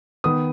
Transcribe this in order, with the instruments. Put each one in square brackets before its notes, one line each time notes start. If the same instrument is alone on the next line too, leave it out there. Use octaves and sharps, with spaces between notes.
[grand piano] D#3 B3 D#6